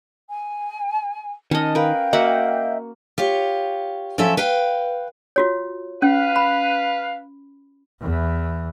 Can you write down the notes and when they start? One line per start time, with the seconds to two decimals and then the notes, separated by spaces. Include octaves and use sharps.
0.29 G#5
1.51 D#3 C#4 D#5 A5 F6
1.75 A#4 B4 F5 G5 G6
2.13 A#3 F#4 D#5 E5 F#5
3.18 F4 G4 C#5
4.18 F3 F#3 C#4 A4 E5
4.37 B4 F5 G5
5.36 F4 F#4 C#5
6.02 C#4 B4 F5
6.36 B5
8.00 E2 E3